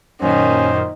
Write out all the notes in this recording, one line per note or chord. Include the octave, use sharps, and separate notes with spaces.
F#2 A#2 D#3 C#4 C5